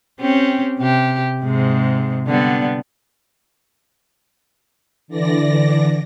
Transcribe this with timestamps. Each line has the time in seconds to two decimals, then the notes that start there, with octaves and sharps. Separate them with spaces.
0.20 C4 C#4 G4
0.79 C3 G4
1.43 G#2 C3 G#3
2.27 D3 G3 B3
5.08 D3 E3 D5 A#6